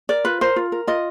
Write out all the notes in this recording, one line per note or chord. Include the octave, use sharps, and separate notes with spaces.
A#4 D5
F4 B4
A#4 C5
F4
A#4
F4 D#5